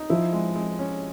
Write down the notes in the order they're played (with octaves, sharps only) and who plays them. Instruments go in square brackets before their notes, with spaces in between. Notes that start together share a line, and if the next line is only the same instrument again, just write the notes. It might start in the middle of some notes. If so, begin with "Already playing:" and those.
Already playing: [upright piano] D#4
[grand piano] F3 [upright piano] E4
[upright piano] G#3
G#3
C#4